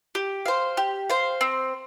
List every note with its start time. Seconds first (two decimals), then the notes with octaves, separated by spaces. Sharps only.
0.15 G4
0.46 C5 F5
0.77 G4
1.10 C5 F5
1.41 C4